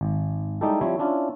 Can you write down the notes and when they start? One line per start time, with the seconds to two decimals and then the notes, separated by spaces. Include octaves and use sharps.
0.01 G#1
0.61 G3 G#3 D#4 E4 G4 A4
0.81 F3 G3 C4 E4 C#5 E5
0.99 C#4 D4 E4 F4